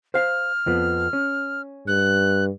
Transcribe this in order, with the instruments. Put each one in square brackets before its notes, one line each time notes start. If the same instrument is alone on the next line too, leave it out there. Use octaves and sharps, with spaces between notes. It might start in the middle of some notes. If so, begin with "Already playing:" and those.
[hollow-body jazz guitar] C5 F5 [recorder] F6
[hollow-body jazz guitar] F2 F3 B3
C#4
[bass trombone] G2 [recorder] F#6